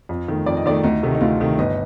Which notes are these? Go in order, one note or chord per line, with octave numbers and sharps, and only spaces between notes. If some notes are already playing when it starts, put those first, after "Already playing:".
F2
D#3 A3
F2 D5
D#5
D#3 A3 D5
D2 D#4
C3 D#3 A3
D#4
D2 F4
C3 D#3 A3
G1 D#5